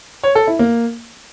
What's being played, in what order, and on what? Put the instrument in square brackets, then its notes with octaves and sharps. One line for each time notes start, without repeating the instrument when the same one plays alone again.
[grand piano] C#5
A4
E4
A#3